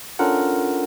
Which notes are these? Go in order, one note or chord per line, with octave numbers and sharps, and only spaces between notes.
C#4 D4 F4 A4 A#4 F#5